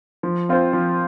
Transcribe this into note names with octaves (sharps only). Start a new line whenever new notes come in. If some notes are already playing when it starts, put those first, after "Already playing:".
F3
C4 F4 C5
F3